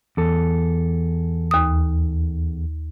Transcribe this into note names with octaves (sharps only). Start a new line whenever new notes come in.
E2 A4
D#2 D#6